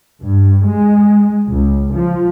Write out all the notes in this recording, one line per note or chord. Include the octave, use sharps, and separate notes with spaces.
G2
G#3
C#2
F3